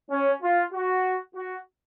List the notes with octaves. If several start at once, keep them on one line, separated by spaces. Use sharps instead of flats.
C#4
F4
F#4
F#4